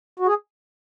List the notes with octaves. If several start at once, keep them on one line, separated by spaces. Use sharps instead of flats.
F#4
G#4